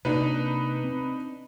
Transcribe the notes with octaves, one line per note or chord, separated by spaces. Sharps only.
C3 A#3 D4 D#4 B4
C4